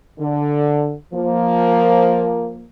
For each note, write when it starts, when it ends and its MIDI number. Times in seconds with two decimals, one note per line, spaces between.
0.19 0.94 50
1.14 2.67 53
1.14 2.67 58